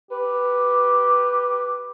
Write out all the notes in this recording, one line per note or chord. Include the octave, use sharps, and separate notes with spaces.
G4 B4